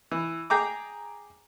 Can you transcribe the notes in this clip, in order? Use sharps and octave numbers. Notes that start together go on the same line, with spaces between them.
E3
G#4 G5 A#5 D6